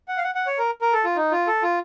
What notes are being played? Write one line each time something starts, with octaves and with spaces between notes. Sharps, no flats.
F#5
F5
F#5
F#5
C#5
A#4
A#4
A4
F4
D#4
F4
A4
F4